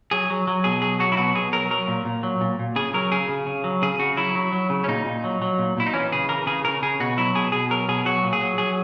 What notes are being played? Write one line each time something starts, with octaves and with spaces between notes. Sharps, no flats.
F#3 G#4
F#3
F#3
B2 G#4
F#3 G#4
F#3 F#4
E4
B2 F#4
B2 G#4
F#3 A#4
F#3 A#4
A#2
A#2
F#3
A#2
A#2
C#3 G#4
F#3 A#4
C#3 G#4
C#3
C#3
F#3
C#3 G#4
C#3 F#4
F#3 E4
F#3
F#3
C#3
C#4
A#2 D#4
A#2
F#3
F#3
A#2
A#2 E4
D#4
E3 C#4
C#3 G#4
E3 A#4
C#3 G#4
C#3 A#4
C#3 G#4
B2 F#4
F#3 E4
B2 G#4
B2 G#4
F#3 A#4
B2 G#4
F#3 F#4
A#2
G#4
F#3
F#3 G#4